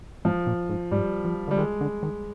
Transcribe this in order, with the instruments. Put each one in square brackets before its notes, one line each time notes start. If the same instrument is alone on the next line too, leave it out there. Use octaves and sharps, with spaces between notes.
[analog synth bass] G#2 [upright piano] F3
[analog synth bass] A#2
G#2
[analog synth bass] G#2 [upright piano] G3
[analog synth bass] F3
[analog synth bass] D3 [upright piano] G3
[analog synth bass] D#3 [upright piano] G#3
[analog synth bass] D3
D#3